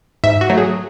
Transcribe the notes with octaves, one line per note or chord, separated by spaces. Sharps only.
G#2 E5
F#4
F#3 A3
G#4